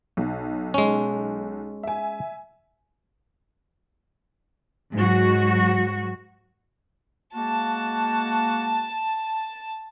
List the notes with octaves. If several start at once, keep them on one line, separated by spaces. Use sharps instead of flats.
B1
G#3 C#4
E5 G#5
G#2 F#3 F#4
G#3 A#3 F#4 A5